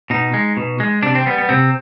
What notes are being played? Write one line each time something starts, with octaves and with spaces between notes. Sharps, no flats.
B2 D#4
G#3
B2
G#3
C3 D4
C4
G3 B3
B3
C3 C4